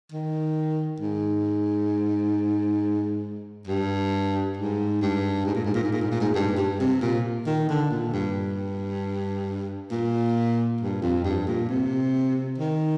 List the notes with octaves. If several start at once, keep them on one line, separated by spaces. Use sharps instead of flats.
D#3
G#2
G2
G#2
G2
G#2
A#2
G#2
A#2
G#2
A#2
G#2
A#2
G#2
G2
G2
C3
A#2
D#3
D3
A#2
G2
A#2
G2
F2
G2
A#2
C3
D#3